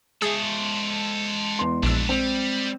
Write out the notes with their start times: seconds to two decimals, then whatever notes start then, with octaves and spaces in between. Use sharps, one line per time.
0.22 G#3 G#4 A4 C5 E5
1.59 E2 C6
1.83 A#1 B3 D4 E6
2.09 G3 C4